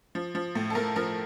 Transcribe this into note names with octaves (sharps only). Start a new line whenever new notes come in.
F3
F3
A2
A4
A2 A#4
F3 A#4